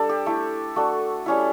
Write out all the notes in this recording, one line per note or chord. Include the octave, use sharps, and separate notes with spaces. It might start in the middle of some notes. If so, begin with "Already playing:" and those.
Already playing: G3 D4 A4
G4
A3 E4
A3 D4 F#4
G3 C#4 E4